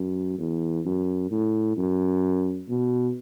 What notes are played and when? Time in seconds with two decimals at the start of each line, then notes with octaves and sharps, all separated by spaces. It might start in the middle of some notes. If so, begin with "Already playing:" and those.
Already playing: F#2
0.39 E2
0.86 F#2
1.31 A2
1.77 F#2
2.69 B2